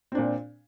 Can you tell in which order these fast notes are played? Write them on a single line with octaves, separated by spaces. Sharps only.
C4 D4 A#2